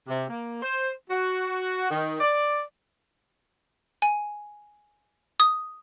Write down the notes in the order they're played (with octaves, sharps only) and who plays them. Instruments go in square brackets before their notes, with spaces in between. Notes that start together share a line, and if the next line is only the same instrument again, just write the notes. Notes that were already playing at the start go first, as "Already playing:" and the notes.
[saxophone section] C3
A#3
C5
F#4
D#3
D5
[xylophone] G#5
D#6